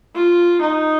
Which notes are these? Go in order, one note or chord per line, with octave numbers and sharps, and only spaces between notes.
F4
D#4